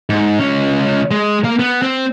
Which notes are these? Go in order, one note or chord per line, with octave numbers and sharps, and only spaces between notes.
G#2
C#2 C#4
G#3
A#3 F5
B3
C4